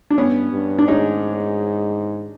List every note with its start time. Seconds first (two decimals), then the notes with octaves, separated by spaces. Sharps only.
0.10 D4
0.18 G2 B3 C#4
0.53 G2
0.79 D4
0.88 G#2 C#4 D#4